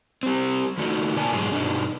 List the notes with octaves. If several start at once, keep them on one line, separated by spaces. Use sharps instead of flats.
G3 C4
F2 D3 A3 D#4 F#4 A4
B2 A#3 D5 G#5 A5
G#2 B2 F#3 G#4
G2 B2 D4 D#4